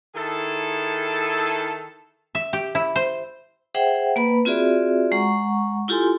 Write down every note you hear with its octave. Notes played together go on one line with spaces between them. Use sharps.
D#3 E4 G#4 A4
E5
G4
E4
C5
G#4 C5 E5 F#5 G5
A#3 B4 B5
C4 F4 F#4 G#4 D5 E5
G#3 F#5 A#5 C#6
E4 F4 G4 A4 G#5 C6